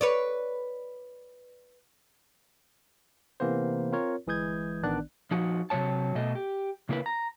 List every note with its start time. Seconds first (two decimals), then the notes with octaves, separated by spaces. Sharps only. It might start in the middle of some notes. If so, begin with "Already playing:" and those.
0.01 B4 C#5 D5
3.40 C3 E3 A#3 B3 C5
3.92 C4 F4 A#4 C#5
4.27 G1 E3 G#3 D#6 G6 G#6
4.83 A1 D#3 B3 D4 D5 F#6
5.31 F3 D#4 F#4
5.70 C3 D#3 F#3 C#5 A5
6.15 B2 A3 D#5
6.35 G4
6.89 C#3 A#3 E4 A#4 B4
7.06 A#5